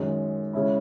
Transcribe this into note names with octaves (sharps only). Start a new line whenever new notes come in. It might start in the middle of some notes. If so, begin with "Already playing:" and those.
Already playing: F#2 D#3 G#3
C#3 G#3 C#4 E4